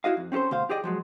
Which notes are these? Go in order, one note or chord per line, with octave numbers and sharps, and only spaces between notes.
E4 F#4 D#5 F5
F2
C4 C#4 F4 A4 C5
D2 B2 C5 F5
G4 G#4 D5 D#5 G5
F3 F#3 G#3